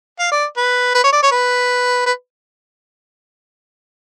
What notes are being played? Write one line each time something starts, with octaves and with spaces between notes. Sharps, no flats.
F5
D5
B4
B4
C#5
D5
C#5
B4
B4